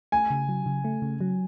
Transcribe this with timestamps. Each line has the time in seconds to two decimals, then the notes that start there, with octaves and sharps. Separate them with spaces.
0.12 A3 G#5
0.30 C#3
0.49 F#3
0.66 C#3
0.84 A3
1.02 C#3
1.21 F#3